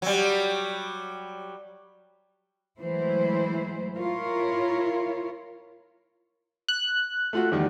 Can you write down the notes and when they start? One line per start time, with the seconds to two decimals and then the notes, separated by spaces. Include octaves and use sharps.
0.02 F#3 G3
2.79 E3 F#3 G#3 A3 E4 C5
3.96 E4 F4 A#4 C#5
6.68 F#6
7.33 A3 F4 F#4
7.52 E2 D#3 G3